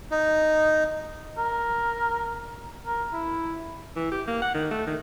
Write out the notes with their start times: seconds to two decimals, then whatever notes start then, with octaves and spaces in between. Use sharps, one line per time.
0.11 D#4
1.38 A#4
2.87 A#4
3.13 E4
3.96 E3
4.12 G4
4.28 A#3
4.42 F#5
4.54 D#3
4.71 A3
4.87 D#3